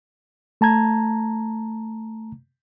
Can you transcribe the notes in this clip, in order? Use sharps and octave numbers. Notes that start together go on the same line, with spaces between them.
A3 A5 A#5 G#6